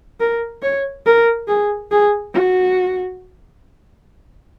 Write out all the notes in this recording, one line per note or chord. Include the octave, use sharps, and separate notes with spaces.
A#4
C#5
A#4
G#4
G#4
F#4